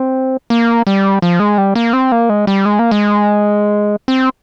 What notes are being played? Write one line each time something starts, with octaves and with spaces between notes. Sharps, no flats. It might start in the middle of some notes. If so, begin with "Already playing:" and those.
Already playing: C4
A#3
G3
F3
G#3
G3
A#3
C4
A#3
G#3
G3
G#3
A#3
G#3
C4